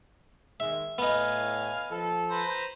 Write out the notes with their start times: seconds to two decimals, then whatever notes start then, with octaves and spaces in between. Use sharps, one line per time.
0.60 D#3 G#3 E5
0.98 A2 B3 D#4 F5 G#5 F6
1.90 F3 A4
2.30 B4 C5 A#5